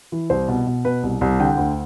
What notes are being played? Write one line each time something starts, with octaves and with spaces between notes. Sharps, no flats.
E3
C2 C5
B2
B2
B2 B4
C2
C2
D3 G5
D2